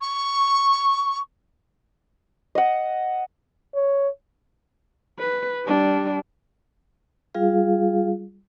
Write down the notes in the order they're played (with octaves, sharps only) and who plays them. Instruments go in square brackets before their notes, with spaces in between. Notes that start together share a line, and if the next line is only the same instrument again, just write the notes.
[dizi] C#6
[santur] D#5 F#5
[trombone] C#5
[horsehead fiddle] B4
G3 D4
[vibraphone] G3 F4 G#4 F5